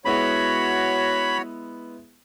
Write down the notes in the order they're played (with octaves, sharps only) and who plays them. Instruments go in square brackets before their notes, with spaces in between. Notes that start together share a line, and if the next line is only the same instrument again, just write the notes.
[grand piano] G#3 B3 E4 [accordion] F#4 C#5 [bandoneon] B5